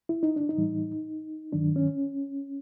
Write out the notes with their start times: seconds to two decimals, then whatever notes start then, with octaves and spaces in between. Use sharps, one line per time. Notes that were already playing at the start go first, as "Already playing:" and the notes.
0.09 E4
0.23 D#4
0.36 D4
0.49 D#4
0.57 A2 E3 G3
1.52 G2 D#3 F#3 D4
1.76 C#4